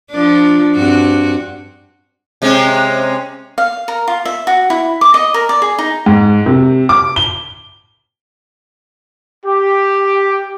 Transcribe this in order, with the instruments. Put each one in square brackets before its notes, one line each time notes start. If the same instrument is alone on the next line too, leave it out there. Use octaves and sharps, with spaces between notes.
[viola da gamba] F3 D4
G2 C4 F#4
[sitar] C3 G#3 C#4
[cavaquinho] F5
A#4
F4
E5
F#4
E4
D6
D#5
A#4
D5
G#4
D#4
[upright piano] G#2
C3
D6
G7
[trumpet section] G4